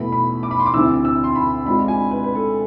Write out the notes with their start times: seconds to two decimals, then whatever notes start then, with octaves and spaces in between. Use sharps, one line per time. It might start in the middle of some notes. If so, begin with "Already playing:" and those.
Already playing: E2 B2 A3 E4 B5
0.12 B5
0.43 D6
0.51 B5
0.59 C6
0.66 D6
0.74 D2 C3 E3 E6
1.05 E6
1.24 C6
1.35 B5
1.66 C3 G#3 D4 F4 B5
1.88 G#5
2.11 B4
2.24 B4
2.35 A4